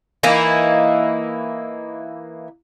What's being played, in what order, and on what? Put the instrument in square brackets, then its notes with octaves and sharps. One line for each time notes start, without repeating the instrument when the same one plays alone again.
[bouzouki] E3 A#3 D#4 E4